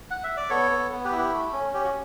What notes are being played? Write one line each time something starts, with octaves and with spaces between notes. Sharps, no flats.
F#5
E5
D5
B3 A4 C#5
B3
B3
G4 B4
E4
G4
A3
C#4
C#4 G4
F#4